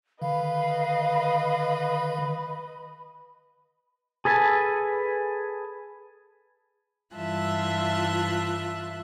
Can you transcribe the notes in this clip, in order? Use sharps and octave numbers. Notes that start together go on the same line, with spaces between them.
D3 D#3 B4 D#5 F5 B5
G#4 A4 B4 G#5 A5
G2 E3 F4 E5 A5 F#6